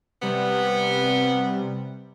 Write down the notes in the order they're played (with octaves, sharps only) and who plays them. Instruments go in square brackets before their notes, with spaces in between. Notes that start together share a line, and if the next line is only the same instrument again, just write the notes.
[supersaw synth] C3 G3 [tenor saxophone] B3